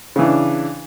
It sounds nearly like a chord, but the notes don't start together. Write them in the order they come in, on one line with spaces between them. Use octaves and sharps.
C#3 E3 D4